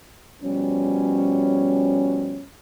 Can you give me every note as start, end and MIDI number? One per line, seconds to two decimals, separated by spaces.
0.42 2.44 47
0.42 2.44 53
0.42 2.44 55
0.42 2.44 61